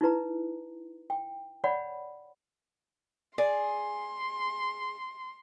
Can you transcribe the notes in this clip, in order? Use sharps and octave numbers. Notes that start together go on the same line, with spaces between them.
D#4 E4 B4 A#5
G5
C#5 D5 F#5 B5
G#4 D5 C6